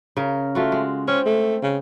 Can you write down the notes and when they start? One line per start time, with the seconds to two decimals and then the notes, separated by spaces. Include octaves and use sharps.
0.17 C#3 A#4
0.55 A3 F4 F#4
0.72 G#3
1.08 C4 C#4
1.26 A3
1.63 C#3